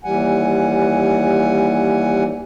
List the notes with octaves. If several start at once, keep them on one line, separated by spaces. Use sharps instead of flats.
D#2 E3 G3 F#5 G#5